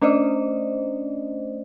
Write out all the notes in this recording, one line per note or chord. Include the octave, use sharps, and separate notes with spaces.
A3 C#4 D4 C5 D5 D#5